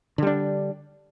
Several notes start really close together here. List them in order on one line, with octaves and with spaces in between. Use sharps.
D3 G3 D4